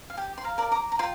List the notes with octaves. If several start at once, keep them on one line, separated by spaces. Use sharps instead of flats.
F5
G4 G5
C6
F5 A#5
A#4 D5
A#5 D6
A#5
F4 G5 C6